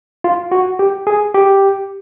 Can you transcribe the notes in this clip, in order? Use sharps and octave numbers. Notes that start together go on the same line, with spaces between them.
F4
F#4
G4
G#4
G4